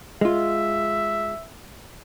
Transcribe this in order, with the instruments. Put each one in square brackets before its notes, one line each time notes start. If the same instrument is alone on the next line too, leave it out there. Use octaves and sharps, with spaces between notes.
[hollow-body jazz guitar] G#3 F4 [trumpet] E5